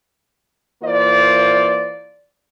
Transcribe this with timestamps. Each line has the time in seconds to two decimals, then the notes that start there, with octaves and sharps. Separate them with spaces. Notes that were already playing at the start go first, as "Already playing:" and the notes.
0.83 E3 A#3 F4 C5 D5